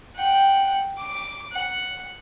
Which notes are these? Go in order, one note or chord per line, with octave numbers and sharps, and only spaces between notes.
F#5 G5
D6
F#5